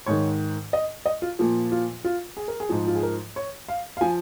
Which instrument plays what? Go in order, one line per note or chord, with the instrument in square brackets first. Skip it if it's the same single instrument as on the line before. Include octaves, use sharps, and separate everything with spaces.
[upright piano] G#2 D#3 C#5
D#5
D#5
F4
A#2 F3
F4
F4
G#4
A#4
G#4
G#2 F3
F4
G#4
A#4
C#5
F5
F5
F3 G#5